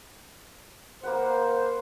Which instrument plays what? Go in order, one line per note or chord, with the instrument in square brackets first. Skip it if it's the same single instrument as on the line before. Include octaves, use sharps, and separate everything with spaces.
[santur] A#3 B4 F#5 [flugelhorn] C5